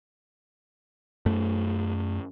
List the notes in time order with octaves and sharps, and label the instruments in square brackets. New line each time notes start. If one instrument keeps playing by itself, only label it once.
[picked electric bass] F#2 A3